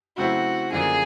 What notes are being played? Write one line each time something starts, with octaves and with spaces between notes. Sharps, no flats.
C#3 F#3 A3 C4 E4 F#4
F#2 D3 F3 A#3 G#4